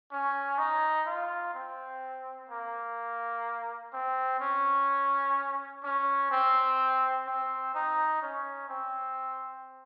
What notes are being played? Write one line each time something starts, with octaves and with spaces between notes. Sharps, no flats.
C#4
D#4
F4
C4
A#3
C4
C#4
C#4
C4
C4
D#4
C#4
C4